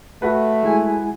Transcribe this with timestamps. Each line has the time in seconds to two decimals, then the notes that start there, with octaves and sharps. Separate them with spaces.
0.22 A3 F#4 B4
0.63 G#3 E4 G#5